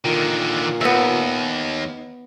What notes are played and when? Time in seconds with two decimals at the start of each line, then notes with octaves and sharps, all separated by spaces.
0.05 A#2 D3 D#3
0.81 D#2 B3 E5